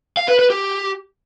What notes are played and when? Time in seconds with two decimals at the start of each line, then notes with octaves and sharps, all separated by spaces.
0.17 F5
0.28 B4
0.39 B4
0.50 G4